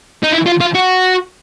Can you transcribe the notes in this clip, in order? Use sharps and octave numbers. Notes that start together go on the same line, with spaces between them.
D#4
E4
F4
F4
F#4